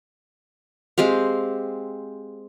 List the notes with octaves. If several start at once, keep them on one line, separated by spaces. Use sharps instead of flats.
G#3 C4 G4 F5